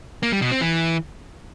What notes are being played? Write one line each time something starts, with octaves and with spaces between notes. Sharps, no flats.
A#3
G3
B2
C4
E3